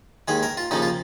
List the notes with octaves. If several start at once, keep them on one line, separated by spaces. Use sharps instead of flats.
D#2 D#3 G#3 G#4
A#4
F4
D#2 C#3 F3 D#4
F4